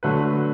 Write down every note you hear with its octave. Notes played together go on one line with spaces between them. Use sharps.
D3 F#3 A3 B4